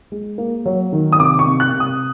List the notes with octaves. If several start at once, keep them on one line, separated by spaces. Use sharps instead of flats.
G#3
A#3
F#3
D#3
D#6
C3 D6
C#6
C3
F#6
C3
D#6